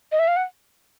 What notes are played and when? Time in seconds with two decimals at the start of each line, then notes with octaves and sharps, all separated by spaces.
0.12 D#5
0.19 E5
0.28 F5
0.36 F#5